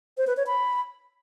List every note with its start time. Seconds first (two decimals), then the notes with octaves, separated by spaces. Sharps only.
0.18 C5
0.27 B4
0.37 C#5
0.47 B5